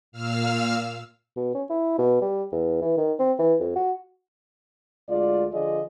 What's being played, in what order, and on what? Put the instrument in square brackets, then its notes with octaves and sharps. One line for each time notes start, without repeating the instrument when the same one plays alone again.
[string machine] A#2 F5 E6 F6
[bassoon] B2
C#4
E4
B2
G3
E2
E3
D#3
C4
E3
F2
F#4
[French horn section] D2 G#3 F4 D5
D3 F3 F4 G#4 D5 D#5